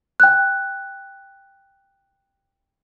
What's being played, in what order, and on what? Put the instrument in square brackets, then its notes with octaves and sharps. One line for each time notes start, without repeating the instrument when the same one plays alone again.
[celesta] G5 F#6